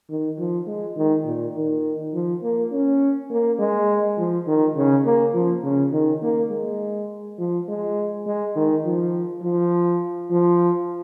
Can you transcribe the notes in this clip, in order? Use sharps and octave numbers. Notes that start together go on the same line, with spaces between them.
D#3
F3
G#3
D#3
A#2
D#3
F3
A#3
C#4
A#3
G#3
F3
D#3
C#3
A#3
F3
C#3
D#3
A#3
G#3
F3
G#3
G#3
D#3
F3
F3
F3